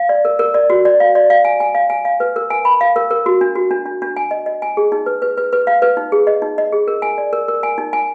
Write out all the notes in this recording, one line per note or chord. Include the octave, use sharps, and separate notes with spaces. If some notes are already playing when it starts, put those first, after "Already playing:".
Already playing: F5
D5
A#4
A#4
D5
F#4
D5
F5
D5
F5
G#5
G#5
F5
G#5
F5
B4
A#4
G#5
B5
F5
A#4
A#4
F#4
D4
F#4
D4
D4
D4
G#5
D#5
D#5
G#5
G#4
D#4
B4
B4
B4
B4
F5
B4
D#4
G#4
D#5
D#4
D#5
G#4
A#4
G#5
D5
A#4
A#4
G#5
D#4
G#5